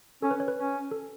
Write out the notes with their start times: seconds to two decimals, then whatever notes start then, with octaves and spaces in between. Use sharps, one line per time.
0.22 C#4 A4
0.31 B4
0.40 C#5
0.48 B4
0.57 C#4
0.91 A4